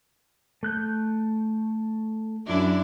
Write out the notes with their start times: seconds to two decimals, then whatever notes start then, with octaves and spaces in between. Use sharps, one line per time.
0.63 A3 F#6 G6
2.47 F#2 D4 E4